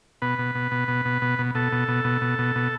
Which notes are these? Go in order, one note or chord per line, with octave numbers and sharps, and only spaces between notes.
B2 B4
B2
B2
B2
B2
B2
B2
B2
B2 A4
B2
B2
B2
B2
B2
B2